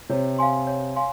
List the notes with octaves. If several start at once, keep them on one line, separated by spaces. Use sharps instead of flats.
C3 C#5
F5 G#5 C6
C#5
F5 G#5 C6